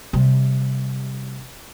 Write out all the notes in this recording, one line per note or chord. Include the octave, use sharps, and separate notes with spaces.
C3 G3